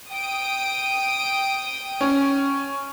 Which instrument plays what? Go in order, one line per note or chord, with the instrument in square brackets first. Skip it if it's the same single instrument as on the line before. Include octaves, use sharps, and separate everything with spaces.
[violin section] G5 D#6 D7
[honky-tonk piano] C#4